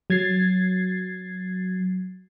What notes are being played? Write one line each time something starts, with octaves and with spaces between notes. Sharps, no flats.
F#3 G#6 A6 C7